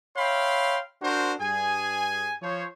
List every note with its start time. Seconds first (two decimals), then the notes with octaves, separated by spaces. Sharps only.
0.17 C#5 E5 F5 G5 B5 C6
1.02 D4 F#4 A#4 C5
1.40 G2 G#4 G#5
2.42 F3 C5 C#5